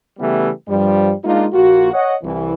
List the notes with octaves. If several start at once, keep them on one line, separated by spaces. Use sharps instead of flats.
C#3 E3 G3 A3 B3 G4
G2 F3 G3
G#3 A#3 D4 D#4 F4
A#1 A#3 F4 F#4
C#5 D#5 F#5
C2 E3